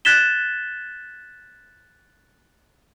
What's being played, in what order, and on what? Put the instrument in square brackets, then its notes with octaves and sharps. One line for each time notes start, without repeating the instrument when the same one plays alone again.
[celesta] F#6 G#6 A6 B6 E7 G7